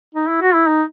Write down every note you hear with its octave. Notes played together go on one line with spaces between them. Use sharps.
D#4
E4
F#4
E4
D#4